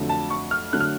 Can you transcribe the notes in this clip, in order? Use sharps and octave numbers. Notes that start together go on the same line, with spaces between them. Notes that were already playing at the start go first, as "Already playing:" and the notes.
Already playing: F2 D3 F#3 A3
A5
C#6
F6
D3 F#3 A3 F#6
F6